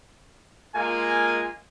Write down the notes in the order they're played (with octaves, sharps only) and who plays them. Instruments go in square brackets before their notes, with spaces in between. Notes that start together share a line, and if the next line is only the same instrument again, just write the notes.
[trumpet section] G#3 A#3 F4 G#5